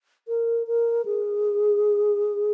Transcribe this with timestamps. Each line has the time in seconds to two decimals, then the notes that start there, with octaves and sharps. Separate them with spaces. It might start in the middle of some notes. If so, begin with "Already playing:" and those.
0.28 A#4
0.67 A#4
1.06 G#4